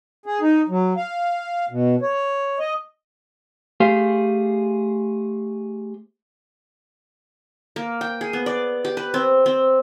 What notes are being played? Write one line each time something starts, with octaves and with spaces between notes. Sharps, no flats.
G#4
D#4
F#3
F5
B2
C#5
D#5
A3 G4 G#4 C5 F5
A#3
G5
G#4
B3
D5
G4
B4
C4
C4